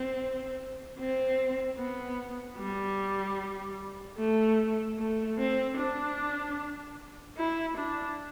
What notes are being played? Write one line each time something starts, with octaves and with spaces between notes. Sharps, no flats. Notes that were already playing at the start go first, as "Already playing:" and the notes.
Already playing: C4
C4
B3
G3
A3
A3
C4
D4
E4
D4